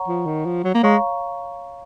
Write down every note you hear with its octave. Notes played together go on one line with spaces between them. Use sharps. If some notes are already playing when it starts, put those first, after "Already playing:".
Already playing: C#5 F#5 A#5 C#6
F3
D#3
F3
F#3
A#3
G#3 C#5 F5 A#5 C#6